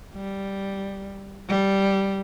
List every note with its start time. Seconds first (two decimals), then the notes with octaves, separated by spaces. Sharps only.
0.15 G3
1.48 G3